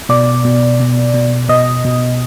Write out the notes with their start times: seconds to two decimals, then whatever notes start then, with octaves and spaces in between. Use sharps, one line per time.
0.09 B2 D5
0.45 B2
0.80 B2
1.14 B2
1.49 B2 D#5
1.85 B2